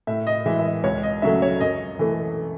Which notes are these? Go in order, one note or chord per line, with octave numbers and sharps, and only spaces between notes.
A2 E5
D#5
E3 G#3 E5
E5
D#5
C#2 C#5
D#5
C#3 F#3 A3 E5
C#5
F#2 D#5
E3 A3